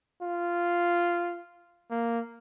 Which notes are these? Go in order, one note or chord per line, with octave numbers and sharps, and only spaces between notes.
F4
A#3